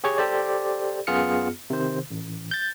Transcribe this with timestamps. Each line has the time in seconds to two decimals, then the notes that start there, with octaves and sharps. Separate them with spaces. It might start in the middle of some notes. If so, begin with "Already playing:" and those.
0.04 G4 G#4 C#5 C#6
0.18 G4 A4 C5 D5
1.07 F#2 B3 F4 G#4 F6 C#7
1.70 C3 D#3 C5
2.11 A1
2.51 G6 A6